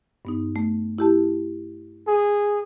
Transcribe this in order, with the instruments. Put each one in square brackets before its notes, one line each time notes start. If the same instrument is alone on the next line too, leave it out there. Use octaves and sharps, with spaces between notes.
[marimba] G2 B3 D#4
A3
E4 G4 A5
[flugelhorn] G#4